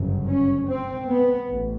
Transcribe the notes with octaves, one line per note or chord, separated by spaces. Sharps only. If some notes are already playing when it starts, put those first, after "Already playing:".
Already playing: G1 F#2 C#3
C#4
C4
B3
A1